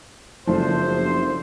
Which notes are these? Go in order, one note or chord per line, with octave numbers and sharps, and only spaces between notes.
F#1 F3 A3 D4 C5